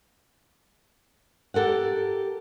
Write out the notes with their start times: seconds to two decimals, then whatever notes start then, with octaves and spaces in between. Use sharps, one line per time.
1.54 G4 A4 A#4 F#5